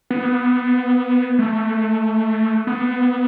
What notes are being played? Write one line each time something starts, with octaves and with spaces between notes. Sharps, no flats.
B3
A3
B3